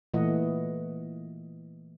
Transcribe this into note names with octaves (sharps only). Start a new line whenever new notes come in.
A#2 E3 A3 D#5 F#5